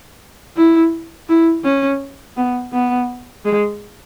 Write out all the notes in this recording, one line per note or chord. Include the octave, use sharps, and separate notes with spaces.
E4
E4
C#4
B3
B3
G#3